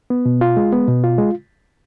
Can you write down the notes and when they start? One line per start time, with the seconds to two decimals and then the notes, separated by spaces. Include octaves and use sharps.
0.10 B3
0.26 B2
0.41 F4
0.57 G#3
0.73 B3
0.88 B2
1.04 F4
1.18 G#3